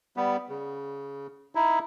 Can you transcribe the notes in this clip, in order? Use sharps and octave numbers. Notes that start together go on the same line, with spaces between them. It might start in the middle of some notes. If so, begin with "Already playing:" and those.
G3 B3
C#3
D#4 E4